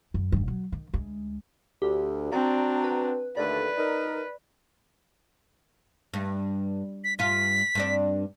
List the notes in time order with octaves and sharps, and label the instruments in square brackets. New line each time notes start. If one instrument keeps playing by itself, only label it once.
[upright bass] F#2
E1 G2
F#3
D#3
D2 G#3
[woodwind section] D2 [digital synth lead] G4
[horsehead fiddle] C4 D4 [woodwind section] F#4 A#5 [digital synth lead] D5
[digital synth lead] B4
[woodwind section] D#2 D3 A3 [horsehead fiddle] B4 [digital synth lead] D5
[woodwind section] D#4 A#4
[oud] G2
[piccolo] B6
[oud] G2 F4 [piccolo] B6
[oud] G2 C4 D4